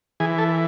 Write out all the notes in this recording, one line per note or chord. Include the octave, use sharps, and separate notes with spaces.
E3 G#4
A4